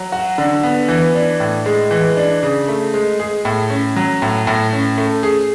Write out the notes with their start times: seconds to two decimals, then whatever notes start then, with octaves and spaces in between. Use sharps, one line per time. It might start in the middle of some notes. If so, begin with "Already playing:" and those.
Already playing: F#3
0.12 F#4
0.38 D3
0.63 B3
0.88 E3
1.15 D4
1.40 A2
1.66 G#3
1.91 E3
2.17 D4
2.43 C#3
2.68 A3
2.94 G#3
3.20 G#4
3.45 A2
3.70 C#4
3.96 F#3
4.22 A2
4.47 A2
4.73 C#4
4.98 A3
5.23 G#4